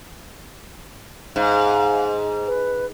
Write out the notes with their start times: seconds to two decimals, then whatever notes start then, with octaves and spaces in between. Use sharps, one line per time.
1.36 G#2 F5
2.47 B4